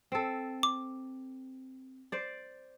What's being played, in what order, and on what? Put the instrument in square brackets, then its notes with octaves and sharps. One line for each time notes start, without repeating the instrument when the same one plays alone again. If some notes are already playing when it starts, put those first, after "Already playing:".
[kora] C4 A4
[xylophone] D6
[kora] C5 D5